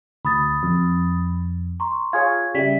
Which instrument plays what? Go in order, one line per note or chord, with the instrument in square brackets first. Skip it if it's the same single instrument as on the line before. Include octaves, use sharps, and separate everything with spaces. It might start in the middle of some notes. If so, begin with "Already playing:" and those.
[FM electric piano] D2 [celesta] B5 D#6 A6
[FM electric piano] F2
[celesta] A#5 C6 C#6
[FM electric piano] F4 G#4 C#5 [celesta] G#6
[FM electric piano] C#3 G3 [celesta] E5 B6